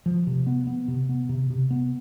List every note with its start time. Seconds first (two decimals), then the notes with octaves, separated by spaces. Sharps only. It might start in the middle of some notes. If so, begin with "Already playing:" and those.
0.06 F3
0.27 C3
0.47 B3
0.67 B3
0.88 C3
1.09 B3
1.29 C3
1.50 C3
1.71 B3